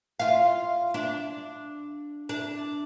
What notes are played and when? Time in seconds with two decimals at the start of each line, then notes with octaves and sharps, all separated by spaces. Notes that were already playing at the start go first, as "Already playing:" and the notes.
0.20 F4 F5
0.94 D4
2.29 D4